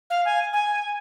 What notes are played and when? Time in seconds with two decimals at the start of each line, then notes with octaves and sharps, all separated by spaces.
0.10 F5
0.25 G#5
0.53 G#5